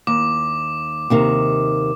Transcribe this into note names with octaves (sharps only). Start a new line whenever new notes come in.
D#2 D6
D#2 C3 D#3